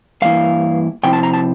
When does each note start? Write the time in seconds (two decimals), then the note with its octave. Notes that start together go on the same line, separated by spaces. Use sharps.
0.22 G2 E3 A#3 E4 F5
1.03 C3 F3 C4 E4 G5
1.13 A5
1.23 A#5
1.33 A5